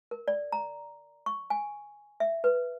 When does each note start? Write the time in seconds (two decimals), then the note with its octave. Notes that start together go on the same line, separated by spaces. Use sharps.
0.11 A#4
0.28 D5
0.52 A#5
1.26 C#6
1.50 G#5
2.20 E5
2.44 B4